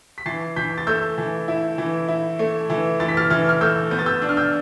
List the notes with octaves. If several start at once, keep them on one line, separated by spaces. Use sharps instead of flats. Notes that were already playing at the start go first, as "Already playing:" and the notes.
B6
E3 A6 C7
E3 G6 B6
A6
A3 E6 G6
E3
E4
E3
E4
A3
E3
E3 A6
B6
F6 A6
E3 F6 A6
F6
A3 E6 G6
B3 G6
A6
E6 G6
D4
F6
E6 G6